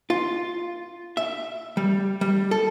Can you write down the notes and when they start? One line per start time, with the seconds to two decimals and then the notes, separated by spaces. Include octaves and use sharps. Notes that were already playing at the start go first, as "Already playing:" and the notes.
0.10 F4
1.17 E5
1.77 G3
2.21 G3
2.51 A4